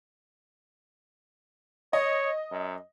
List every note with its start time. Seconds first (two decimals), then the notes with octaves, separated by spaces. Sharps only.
1.93 C#5 D#5
2.51 F#2